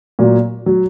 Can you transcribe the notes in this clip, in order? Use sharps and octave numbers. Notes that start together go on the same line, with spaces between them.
A#2 F#3
F#3